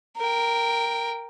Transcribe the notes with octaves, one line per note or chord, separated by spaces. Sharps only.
A#4 G5